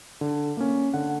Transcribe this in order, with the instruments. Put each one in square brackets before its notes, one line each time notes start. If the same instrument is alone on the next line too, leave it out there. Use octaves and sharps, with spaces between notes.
[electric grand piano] D3
A#3 C#4
D3 F#5